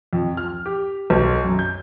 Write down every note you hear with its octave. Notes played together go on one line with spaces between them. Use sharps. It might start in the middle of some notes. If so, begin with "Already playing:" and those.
F2
F6
G4
B1
F#2
G6